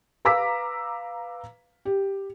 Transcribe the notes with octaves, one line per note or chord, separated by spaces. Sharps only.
B4 F5 A#5 D6 E6 B6
G4